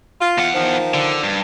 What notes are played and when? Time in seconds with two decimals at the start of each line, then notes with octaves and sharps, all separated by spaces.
0.21 F4
0.38 E2 F#5
0.54 D#3 F3
0.94 D3
1.23 G2